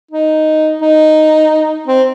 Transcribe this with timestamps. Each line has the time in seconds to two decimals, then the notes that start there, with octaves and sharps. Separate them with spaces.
0.11 D#4
0.81 D#4
1.87 C4